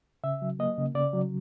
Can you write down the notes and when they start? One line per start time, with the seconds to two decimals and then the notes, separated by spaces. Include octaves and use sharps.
0.24 C#3 E5
0.42 F#3
0.59 A#3 D#5
0.78 C#3
0.95 C#3 D5
1.13 F#3